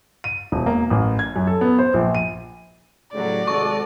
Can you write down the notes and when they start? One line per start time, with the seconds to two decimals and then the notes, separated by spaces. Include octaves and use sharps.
0.24 D#7
0.52 E1
0.66 A#3
0.90 A1
1.19 G#6
1.36 F#2
1.47 A4
1.61 B3
1.79 C5
1.94 A#1
2.15 D#7
3.14 A2 C#3 F#3 G3 D5
3.47 G#1 C3 G#3 F#4 A4 C#6